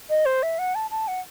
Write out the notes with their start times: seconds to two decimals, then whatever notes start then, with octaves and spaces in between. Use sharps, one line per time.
0.10 D#5
0.26 C5
0.43 E5
0.59 F#5
0.75 A5
0.91 A5
1.08 F#5